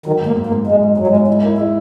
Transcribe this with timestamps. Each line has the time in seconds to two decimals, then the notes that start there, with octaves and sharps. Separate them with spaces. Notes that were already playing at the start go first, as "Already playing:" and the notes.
0.06 D#3 F#3
0.20 G#2
0.26 A#3
0.36 G#2
0.46 A#3
0.51 G#2
0.67 G#2 G#3
0.82 G#2
0.97 G#2 F#3
1.07 G#3
1.13 G#2 F#3
1.27 G#3 E4
1.43 A#3 E4
1.58 G#3 E4